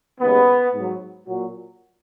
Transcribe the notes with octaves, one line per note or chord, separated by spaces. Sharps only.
D#2 C#3 G#3 B3
G#2
F#3
A#2 F#3